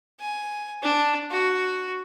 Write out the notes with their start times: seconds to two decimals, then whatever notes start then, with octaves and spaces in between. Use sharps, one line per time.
0.20 G#5
0.83 D4
1.31 F#4